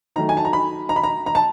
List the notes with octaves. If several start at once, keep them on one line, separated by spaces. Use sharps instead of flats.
D#3 F#3 A3 A#5
G#5
A5
A#5
B5
A#5
B5
A#5
A#5
A5